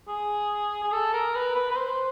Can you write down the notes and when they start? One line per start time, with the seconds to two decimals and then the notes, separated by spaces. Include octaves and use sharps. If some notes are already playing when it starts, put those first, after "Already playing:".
0.08 G#4
0.83 G#4
0.92 A4
1.13 A#4
1.35 B4
1.55 B4
1.71 B4
1.77 C5